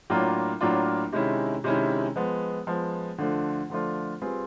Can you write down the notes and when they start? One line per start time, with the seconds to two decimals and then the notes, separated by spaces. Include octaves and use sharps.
0.10 A2 F#3 A#3 D4 F4
0.61 A2 F#3 A#3 D4 F4
1.12 C3 D#3 G#3 C#4 E4
1.64 C3 D#3 G#3 C#4 E4
2.16 F3 G#3 B3
2.67 F3 G#3 B3
3.18 D3 F3 A3 D4 F4
3.70 D3 F3 A3 D4 F4
4.21 G3 C4 F4 G#4 B4